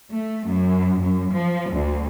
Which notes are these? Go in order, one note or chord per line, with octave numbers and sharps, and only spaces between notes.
A3
F#2
F#2
F3
D2